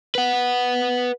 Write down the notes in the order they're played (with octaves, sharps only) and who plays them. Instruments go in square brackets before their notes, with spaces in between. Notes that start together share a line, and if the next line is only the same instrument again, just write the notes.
[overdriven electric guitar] B4 F#5